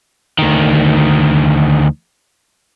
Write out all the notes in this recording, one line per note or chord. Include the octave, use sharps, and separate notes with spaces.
D2 D#3